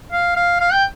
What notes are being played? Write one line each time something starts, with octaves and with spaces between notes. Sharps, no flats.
F5
F5
F5
G5